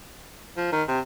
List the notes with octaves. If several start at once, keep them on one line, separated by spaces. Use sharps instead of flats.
F3
D#3
C3